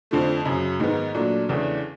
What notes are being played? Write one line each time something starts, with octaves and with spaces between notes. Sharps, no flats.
F2 D3 F3 A3
F#2 C#3 F#3
G#2 D#3 G#3 B3
A#2 F#3 A3 D4
E2 C#3 E3 A3 D4